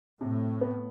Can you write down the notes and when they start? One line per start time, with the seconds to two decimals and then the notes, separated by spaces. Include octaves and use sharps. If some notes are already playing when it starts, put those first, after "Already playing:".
0.21 A2 C3
0.61 B3